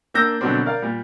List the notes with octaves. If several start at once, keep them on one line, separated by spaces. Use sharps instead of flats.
A#3 D4 E6 G6 A#6
B2 D3 F#3 G3 C4 D4
A#4 D5 F5
A#2 G3